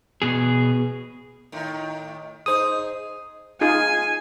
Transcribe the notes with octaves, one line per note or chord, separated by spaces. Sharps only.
B2 G#4
A2 D#3
D#4 G#4 C5 D#6
D#4 F4 G#4 G#5